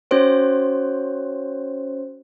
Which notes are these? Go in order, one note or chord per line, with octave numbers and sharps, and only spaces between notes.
C#4 F#4 C5 C#5